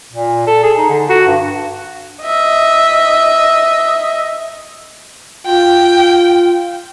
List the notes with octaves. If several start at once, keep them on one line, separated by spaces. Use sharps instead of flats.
A#2
A4
G#4
D#4
D3
F#4
G2
D#5 E5
F4 G5